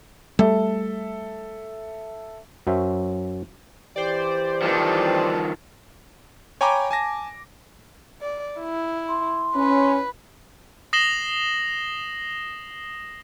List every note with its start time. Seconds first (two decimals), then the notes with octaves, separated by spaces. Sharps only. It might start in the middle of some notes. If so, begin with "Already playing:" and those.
0.39 G3 A3 A4 E5
2.67 F#2 F#3 C#4 C5 E5
3.96 E3 G4 C5 D5
4.62 D#3 F3 A4 B4
6.61 C#5 G5 G#5 A#5 B5 D6
6.91 G#5 A5 A#6
8.21 D5
8.60 E4
9.08 C6
9.55 C#4 B4
10.93 D#6 A#6 C7 E7 F#7 G7